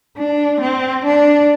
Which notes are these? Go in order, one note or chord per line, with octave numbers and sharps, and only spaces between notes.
D4
C4
D4